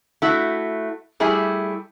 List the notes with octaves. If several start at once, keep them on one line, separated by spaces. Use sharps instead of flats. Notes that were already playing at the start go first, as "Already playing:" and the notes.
A3 E4 F#4
G3 A3 E4 G4 G#4